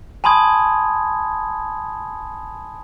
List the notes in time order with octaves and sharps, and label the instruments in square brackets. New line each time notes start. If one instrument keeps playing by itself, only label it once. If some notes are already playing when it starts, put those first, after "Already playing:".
[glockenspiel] G#5 A5 B5 C6 D#6 G#6